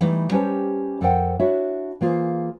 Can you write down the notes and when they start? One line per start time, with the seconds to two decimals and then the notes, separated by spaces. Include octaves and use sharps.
0.01 E3 G3 A3 D#4 E4
0.31 G3 C#4 G4 B4 C5 A5
1.01 F2 A4 A#4 C5 F#5 G5
1.40 D4 E4 F#4 C#5 E5
2.01 E3 A#3 F4 G#4 C5